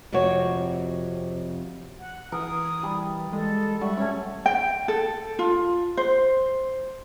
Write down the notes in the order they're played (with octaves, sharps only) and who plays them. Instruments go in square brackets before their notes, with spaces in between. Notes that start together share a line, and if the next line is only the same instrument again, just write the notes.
[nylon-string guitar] F2 C3 C4 F#4 C#5
[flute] F#5
[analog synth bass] E3 [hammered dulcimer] A#4 [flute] D#6
[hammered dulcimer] G3 A5
[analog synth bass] G#3 [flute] A4
[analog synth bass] G3 [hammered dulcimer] E5 F#5 [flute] C#6
[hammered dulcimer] A3 C#5 [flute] C#4
[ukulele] G5
A4
F4
C5